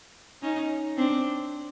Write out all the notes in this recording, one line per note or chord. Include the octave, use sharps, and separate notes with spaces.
C#4 D#4
C4 D4